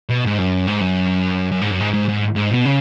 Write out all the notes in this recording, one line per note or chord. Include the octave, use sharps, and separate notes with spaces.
B2
G#2
F#2
G#2
F#2
F#2
G#2
F#2
G#2
G#2
G#2
G#2
B2
C#3